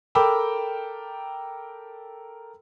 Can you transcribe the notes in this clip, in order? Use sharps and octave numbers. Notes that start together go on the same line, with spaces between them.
A4 A#4 G5 B5 D6 E6